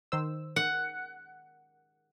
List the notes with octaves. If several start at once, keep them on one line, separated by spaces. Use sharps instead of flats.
D#3 C5 E6
F#5